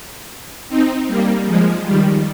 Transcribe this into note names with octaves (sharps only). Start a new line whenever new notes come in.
C4 D#4
G3 A#3
F3 G#3
D#3 G3